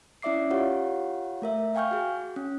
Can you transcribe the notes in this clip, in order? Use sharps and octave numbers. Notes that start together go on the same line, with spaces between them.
C#4 E4 D5 E5 D6 C7
F4 G4 C#5 F5 F#5
A3 A#4 E5
F5 G5 G#5 C#6 F6 G6
F#4 G#4
C#4